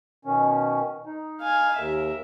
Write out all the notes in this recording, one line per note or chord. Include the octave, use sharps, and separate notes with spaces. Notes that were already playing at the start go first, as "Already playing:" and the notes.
B2 D#3 C#4
D#4
F5 G#5
D#2 A#4 E5